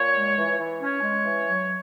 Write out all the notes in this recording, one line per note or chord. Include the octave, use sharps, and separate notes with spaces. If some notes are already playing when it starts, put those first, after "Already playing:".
Already playing: A#2 C#5
G#3
E3
E3
C#4 C#5
G#3
E3
F#3